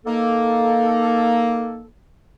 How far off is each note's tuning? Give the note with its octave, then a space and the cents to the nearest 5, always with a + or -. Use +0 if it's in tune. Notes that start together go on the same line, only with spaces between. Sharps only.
A#3 +5 D#4 +0 A4 +0